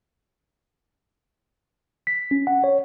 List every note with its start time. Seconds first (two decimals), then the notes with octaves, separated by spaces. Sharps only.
2.07 B6
2.31 C#4
2.47 F#5
2.64 C#5